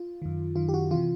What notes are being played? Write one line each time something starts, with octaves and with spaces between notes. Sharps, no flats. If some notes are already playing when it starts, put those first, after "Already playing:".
Already playing: F4
F#2 D#3
F#2 D#3 F4
G4
F#4
C3 E3 F4